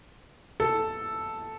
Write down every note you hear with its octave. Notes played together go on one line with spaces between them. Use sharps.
A4